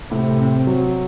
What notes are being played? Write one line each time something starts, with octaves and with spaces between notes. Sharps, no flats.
A2 C3
C4
F#3